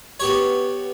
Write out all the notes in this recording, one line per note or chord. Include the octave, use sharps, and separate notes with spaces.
B3 G4 C#5